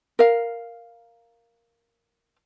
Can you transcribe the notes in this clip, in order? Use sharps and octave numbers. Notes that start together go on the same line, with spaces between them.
A#4 F5